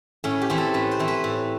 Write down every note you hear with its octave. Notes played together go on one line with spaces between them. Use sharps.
A2 C#4
G4
E3 A3 C4
A4
A2 B4
C5
E3 A3 C4
B4
A2